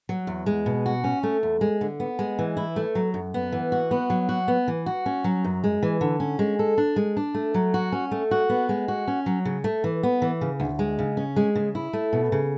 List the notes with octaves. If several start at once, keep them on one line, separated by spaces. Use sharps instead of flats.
F#3
E2
G#3
B2
F#4
C#4
A3
E2
G#3
D3
B3
G#3
E3
E4
A3
F#3
F#2
B3
E3
F#4
B3
F#3
F#4
B3
E3
F#4
C#4
F#3
F#2
G#3
E3
D3
C#4
G#3
A4
D4
G#3
D4
A3
F#3
F#4
C#4
A3
F#4
B3
G#3
F#4
C#4
F#3
C#3
A3
E3
B3
E3
C#3
D2
G#3
C#3
C#4
G#3
C#3
E4
A3
B2
C#3